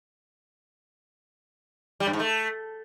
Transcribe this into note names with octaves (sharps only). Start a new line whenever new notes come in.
G3
G2
G#2
A3